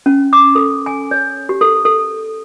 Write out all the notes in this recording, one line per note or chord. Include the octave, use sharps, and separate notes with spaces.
C#4
D6
A4
G#5
C#5
G4
A4
A4